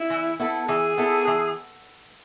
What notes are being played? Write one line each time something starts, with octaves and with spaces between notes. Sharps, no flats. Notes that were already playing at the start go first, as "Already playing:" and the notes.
Already playing: E4
E3
B3 E4 A4
E3 G#4
B3 E4 A4
E3